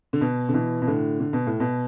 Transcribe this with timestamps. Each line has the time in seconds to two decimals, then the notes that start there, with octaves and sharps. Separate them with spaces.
0.13 D3
0.21 B2
0.49 D3
0.54 B2 E3
0.82 B2
0.87 A2 D3
1.20 D3
1.33 B2
1.47 A2
1.60 B2